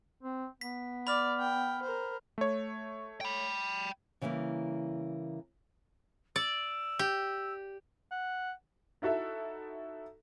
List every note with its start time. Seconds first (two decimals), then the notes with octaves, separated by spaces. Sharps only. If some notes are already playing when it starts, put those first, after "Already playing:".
0.23 C4
0.61 B3 B6
1.07 D5 B5 F6
1.39 G5
1.82 A#4 C5
2.38 A3 C#5
3.21 G5 B5
4.22 C#3 E3 G3 G#3 A#3
6.36 D5 E6
6.99 G4
8.11 F#5
9.02 D#4 E4 F#4 A4 E5